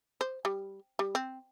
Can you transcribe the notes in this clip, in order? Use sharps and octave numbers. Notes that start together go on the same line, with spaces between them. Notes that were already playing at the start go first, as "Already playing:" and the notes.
C5
G3
G3
C4